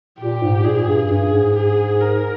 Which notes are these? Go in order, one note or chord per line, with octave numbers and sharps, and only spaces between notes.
A#2 G4
G#2
A#2 G#4
G2
G2 G#4
G#2
G#4
A#4